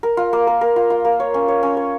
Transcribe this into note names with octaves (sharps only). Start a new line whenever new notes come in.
A#4
F4
A#3
A#4
A#4
F4
F4
A#3
C#5
C#4
C#5
C#4
C#5